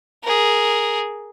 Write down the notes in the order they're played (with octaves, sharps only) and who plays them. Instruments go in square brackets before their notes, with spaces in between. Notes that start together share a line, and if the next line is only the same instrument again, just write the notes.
[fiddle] G#4 A#4